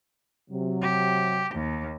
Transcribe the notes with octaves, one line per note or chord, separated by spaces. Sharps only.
C3 F#3
G4
D#2